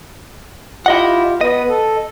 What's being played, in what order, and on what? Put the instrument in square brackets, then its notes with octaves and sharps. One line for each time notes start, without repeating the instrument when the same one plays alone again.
[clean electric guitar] E4 D#5 F#5 [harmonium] F4 G4
[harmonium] B3 B4 [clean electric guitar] D#5
[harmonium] A4